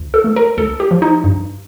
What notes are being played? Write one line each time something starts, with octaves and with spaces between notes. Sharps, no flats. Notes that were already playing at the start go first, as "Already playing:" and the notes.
Already playing: D2
A4
A3
A#4
D2 A4
G4
F3
D#4
G2